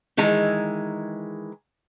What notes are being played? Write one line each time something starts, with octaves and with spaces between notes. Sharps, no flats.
D#3 E3 G#3 G#4 A#5